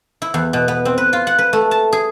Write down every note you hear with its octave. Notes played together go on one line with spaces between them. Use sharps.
E4
E2
B2
B3
C4
B4
F4
F#5
B4
A3
A5
G#4